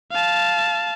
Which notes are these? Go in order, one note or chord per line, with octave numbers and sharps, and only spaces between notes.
F5 A5